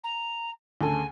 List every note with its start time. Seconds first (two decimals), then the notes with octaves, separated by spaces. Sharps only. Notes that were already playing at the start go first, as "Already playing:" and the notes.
0.03 A#5
0.81 D2 C#3 A4 G#5